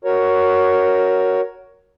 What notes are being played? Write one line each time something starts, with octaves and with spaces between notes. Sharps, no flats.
F#4 A#4 C#5